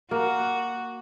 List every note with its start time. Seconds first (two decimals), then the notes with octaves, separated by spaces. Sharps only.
0.11 A#3 F#4